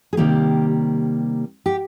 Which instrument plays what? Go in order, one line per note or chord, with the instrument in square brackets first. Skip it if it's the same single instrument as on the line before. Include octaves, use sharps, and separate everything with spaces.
[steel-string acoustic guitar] G#4
C3 D#3 G3 A#3 G4
G4